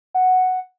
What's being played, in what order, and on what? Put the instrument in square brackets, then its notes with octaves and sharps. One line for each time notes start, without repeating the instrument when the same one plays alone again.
[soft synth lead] F#5